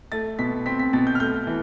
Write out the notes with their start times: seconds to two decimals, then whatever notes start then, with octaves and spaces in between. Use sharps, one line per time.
0.12 A3 A6
0.39 B2 B6
0.66 C4 B6
0.79 B6
0.93 B2 A6
1.07 G6
1.15 F6
1.20 A3 G6
1.47 E3